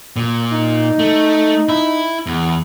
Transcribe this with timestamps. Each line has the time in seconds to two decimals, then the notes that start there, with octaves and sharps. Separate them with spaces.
0.16 A#2
0.53 D#4
0.99 A3
1.69 E4
2.26 E2